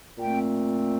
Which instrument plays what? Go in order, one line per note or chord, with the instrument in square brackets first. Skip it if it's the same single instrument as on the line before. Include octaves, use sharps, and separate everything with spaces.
[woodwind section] A#2 A3 C4 G5